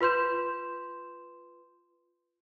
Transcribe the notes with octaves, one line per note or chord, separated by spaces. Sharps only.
F4 B4 C6 G6 E7